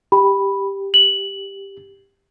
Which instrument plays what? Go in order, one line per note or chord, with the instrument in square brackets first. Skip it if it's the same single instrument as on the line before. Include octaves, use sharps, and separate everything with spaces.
[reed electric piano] G4 [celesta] B5
[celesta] F#7